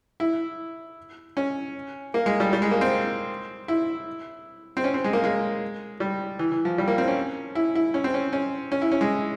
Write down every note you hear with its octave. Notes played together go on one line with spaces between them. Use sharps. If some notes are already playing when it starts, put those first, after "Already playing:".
E4
C#4
A#3
G#3
G3
G3
G#3
A#3
C4
E4
C4
C#4
C4
G#3
A#3
G#3
G3
E3
E3
F3
G3
A#3
C4
C#4
E4
E4
C#4
C4
C#4
C#4
C#4
E4
C#4
G#3